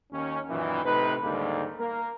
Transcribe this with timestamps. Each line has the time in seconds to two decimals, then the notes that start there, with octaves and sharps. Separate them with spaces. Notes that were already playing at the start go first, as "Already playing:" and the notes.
0.12 D#2 D#3 C#4
0.49 F#2 A#2 D#3 E3
0.84 A2 C3 D#4 B4
1.23 D#2 G#2 D3 G3 A#3
1.80 A#3 A#4